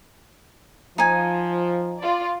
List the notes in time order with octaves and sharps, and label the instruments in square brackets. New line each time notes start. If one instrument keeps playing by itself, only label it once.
[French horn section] F3 [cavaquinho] D#4 G#5
[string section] F4 D5